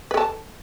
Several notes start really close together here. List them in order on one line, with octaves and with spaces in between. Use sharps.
B4 A4 A5